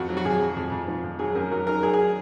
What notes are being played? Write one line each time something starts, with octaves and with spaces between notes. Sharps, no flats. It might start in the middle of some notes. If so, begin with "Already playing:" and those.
Already playing: F2 F#4
F#3
F#4
F2 G#4
F#3
F2
F2
F3
F2
F#3 G#4
F#2 A#4
F#3 A#4
D#3 A#4
F#3 G#4
G#4